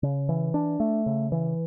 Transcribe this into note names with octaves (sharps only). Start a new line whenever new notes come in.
C#3
E3
D4
A3
C#3
E3